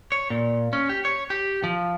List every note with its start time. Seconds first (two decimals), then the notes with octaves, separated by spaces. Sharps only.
0.12 C#5
0.30 A#2
0.73 C#4
0.89 G4
1.05 C#5
1.30 G4
1.64 F3